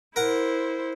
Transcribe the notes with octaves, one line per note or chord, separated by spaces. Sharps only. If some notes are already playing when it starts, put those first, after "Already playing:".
E4 A#4 C5 F#5